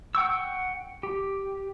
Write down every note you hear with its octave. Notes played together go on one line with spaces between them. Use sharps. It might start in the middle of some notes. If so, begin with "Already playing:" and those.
F#5 G5 C#6 E6
G4